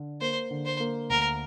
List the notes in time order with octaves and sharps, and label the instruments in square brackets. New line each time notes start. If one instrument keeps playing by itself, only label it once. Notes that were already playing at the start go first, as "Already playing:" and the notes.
Already playing: [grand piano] D3
[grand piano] A#3 [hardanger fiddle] C5
[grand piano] D3
[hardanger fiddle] C5
[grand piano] A#3
[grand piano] D2 [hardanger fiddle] A#4